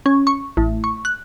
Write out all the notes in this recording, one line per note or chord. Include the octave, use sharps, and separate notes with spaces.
C#4
C#6
A1
C#6
F#6